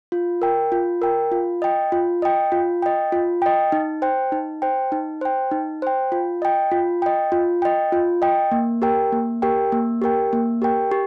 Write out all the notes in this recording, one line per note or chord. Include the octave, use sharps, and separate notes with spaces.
F4
A#4 G5
F4
A#4 G5
F4
D#5 G5
F4
D#5 G5
F4
D#5 G5
F4
D#5 G5
D#4
C5 G5
D#4
C5 G5
D#4
C5 G5
D#4
C5 G5
F4
D#5 G5
F4
D#5 G5
F4
D#5 G5
F4
D#5 G5
A#3
G4 A#4 G5
A#3
G4 A#4 G5
A#3
G4 A#4 G5
A#3
G4 A#4 G5
G4